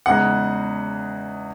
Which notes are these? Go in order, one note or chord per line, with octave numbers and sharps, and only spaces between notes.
E2 C#3 G#3 D#4 F#5